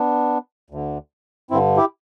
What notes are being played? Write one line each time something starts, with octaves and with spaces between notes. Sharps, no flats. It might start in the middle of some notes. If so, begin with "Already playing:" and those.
Already playing: B3 D4
D2 D3
G2 D3 C4 E4
E4 G4